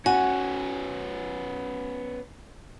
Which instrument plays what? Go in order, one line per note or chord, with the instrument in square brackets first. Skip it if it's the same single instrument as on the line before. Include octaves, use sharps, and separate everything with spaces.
[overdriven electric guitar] B3 C#4 [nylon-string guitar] F#4 [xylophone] G#5